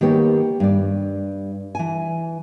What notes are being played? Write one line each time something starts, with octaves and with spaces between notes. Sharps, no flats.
D#3 A#3 B3 G4 C#5
G2 D5
E3 G#5